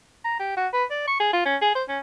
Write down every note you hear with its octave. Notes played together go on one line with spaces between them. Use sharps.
A#5
G4
F#4
B4
D5
C#6
G#4
F4
C#4
G#4
C5
C#4